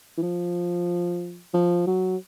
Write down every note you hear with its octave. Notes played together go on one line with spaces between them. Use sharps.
E3
F3
F3
F#3